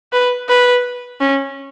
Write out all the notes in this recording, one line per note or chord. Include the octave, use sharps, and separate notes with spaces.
B4
B4
C#4